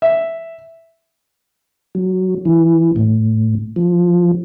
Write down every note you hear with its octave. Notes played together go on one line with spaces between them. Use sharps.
E5
F#3
E3
A2
F3